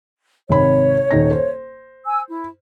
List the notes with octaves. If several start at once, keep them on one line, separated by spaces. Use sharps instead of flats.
G#1 C3 C#5 B5
D#1 D#4 A#6
C5
G#5 E6
E4